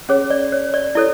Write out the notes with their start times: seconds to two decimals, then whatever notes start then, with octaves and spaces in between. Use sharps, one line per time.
0.09 C#4 G#4 C#5
0.30 D5
0.52 C#5
0.74 D5
0.95 E4 A4 C#5 D5